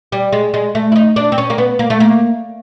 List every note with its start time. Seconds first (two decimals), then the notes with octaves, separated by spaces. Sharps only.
0.12 G3
0.32 G#3
0.54 G#3
0.75 A3
0.92 E4
0.96 D#4
1.16 D4
1.32 C4
1.38 C#4
1.50 A#3
1.58 B3
1.79 A#3
1.90 A3
2.00 A#3